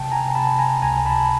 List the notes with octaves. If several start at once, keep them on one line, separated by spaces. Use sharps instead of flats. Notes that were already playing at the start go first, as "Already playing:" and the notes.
Already playing: C3 G5 A5
G#5 A#5
C3 A5 B5
G#5 A#5
C#2 G#5 A#5
A5 B5